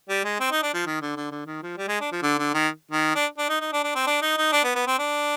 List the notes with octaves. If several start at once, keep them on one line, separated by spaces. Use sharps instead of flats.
G3
G#3
C4
D#4
D4
F3
D#3
D3
D3
D3
D#3
F3
G3
G#3
D4
F3
D3
D3
D#3
D#3
D4
D4
D#4
D#4
D4
D4
C4
D4
D#4
D#4
D4
B3
B3
C4
D4